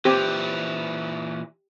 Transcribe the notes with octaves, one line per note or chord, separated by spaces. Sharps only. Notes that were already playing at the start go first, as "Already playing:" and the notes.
A#2 E3 C4 G4